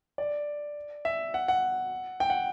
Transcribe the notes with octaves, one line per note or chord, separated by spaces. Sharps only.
D5
E5
F#5
F#5
G5
F#5